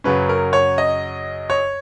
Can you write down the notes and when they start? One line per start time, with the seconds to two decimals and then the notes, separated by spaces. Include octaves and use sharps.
0.04 F#2 C#3 F#3 C#4 B4
0.29 A#4
0.53 C#5
0.78 D#5
1.50 C#5